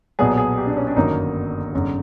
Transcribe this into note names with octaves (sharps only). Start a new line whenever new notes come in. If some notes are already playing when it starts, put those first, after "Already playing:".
B1 A#2 F#3 B3 G#4
G#4
G4
D4
C#4
D4
G1 F#2 D#3 F#3 A#3 D#4
G1 F#2 C#3